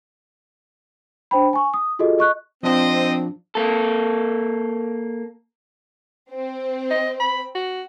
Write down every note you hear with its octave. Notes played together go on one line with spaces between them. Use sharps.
D4 C5 G5 B5
G#5 C#6
D#6
F4 F#4 G#4 A4 D#5
D#5 C#6 F#6
F3 C4 D4 F4 D#5
A#3 A4
C4 C5
D#5
B5
F#4